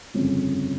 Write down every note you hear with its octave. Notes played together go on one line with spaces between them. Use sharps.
G1 F2 C#3 F3